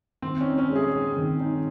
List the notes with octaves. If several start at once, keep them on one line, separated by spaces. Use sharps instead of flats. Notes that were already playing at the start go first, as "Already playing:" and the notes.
D#3 C4
C#4
D#4
C#4
G#3
G#4
C4
D#3
D#4